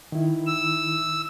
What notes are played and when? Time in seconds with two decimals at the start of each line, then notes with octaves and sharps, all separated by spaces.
0.12 D#3 E4
0.46 E6